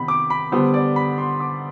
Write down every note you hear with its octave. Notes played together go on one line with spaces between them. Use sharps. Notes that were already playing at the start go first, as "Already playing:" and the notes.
Already playing: C3 D#3 B3 B5
D6
B5
D3 G3 B3 C5
D5
B5
C6
D6